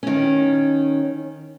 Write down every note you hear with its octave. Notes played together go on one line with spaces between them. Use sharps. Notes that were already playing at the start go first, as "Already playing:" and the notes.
D#3 C#4